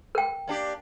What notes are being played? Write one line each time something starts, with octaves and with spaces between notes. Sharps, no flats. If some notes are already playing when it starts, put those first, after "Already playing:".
A#4 G5
A#3 D4 G4